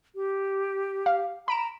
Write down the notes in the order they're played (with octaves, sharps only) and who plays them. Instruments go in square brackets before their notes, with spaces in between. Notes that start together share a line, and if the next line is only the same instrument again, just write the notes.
[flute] G4
[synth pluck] F5
[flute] A#5 [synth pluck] B5 D7 E7